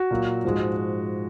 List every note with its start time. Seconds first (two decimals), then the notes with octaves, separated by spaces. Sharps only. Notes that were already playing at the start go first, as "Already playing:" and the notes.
Already playing: F#4
0.11 A#2 F#3 A#3
0.44 G#2 F3 G#3